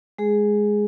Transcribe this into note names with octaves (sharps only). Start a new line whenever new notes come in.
G#3 G#4